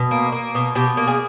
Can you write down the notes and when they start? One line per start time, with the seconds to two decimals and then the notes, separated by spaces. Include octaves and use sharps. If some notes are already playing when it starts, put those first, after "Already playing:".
Already playing: B2
0.11 A#3
0.32 A#3
0.55 B2
0.75 B2 G4
0.97 A#3
1.07 G#4